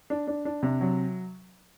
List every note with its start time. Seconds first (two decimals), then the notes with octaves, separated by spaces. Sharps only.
0.10 D4
0.27 D4
0.45 D4
0.63 C3
0.81 F#3